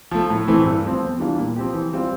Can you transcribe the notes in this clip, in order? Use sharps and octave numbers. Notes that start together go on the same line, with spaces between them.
F3 A3
A2
E3 A3 C4 E4
G2
F3 C4
E2
E3 G3 D4 F4
A#2
F3 C4 G4
E3
G3 C4 F4